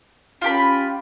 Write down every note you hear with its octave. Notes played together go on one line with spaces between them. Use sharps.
C#4 F4 G4 B5